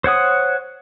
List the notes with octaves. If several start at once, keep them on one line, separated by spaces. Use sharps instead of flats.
C5 C#5 F#5 D#6